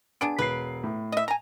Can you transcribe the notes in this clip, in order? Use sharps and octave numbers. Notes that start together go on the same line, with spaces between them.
B3 D4 G#4 D7
E1 B4 C7
A2
D#5 E5
G#5 A#5